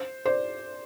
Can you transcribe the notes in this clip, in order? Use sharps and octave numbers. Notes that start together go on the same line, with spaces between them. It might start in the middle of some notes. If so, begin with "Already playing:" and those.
Already playing: C5
C5 D5